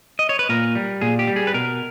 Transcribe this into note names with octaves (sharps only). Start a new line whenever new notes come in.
D#5
C#5
B4
A#2 A#4
G3
A#2 G#4
G4
G3
G#4
B4
B2 A#4